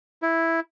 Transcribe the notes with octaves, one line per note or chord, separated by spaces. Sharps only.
E4